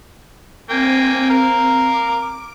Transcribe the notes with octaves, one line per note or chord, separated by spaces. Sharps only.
A#3 C4 G5 G#5
A#4 F5
D6